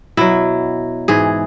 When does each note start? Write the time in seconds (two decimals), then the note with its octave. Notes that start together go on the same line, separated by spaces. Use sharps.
0.17 B2 F#3 E4
1.08 G#2 E3 G#4